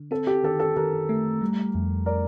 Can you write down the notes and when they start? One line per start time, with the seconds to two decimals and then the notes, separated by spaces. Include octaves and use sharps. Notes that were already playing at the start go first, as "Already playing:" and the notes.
Already playing: D3
0.11 C4 A4
0.27 G4
0.44 D#3 A4
0.60 A4
0.76 D#3 G4 A#4
1.09 A3
1.41 G3
1.75 F2
2.06 A#4 D5